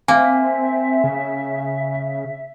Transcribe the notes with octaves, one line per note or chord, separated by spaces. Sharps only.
A#3 C4 E5 G#5
C#3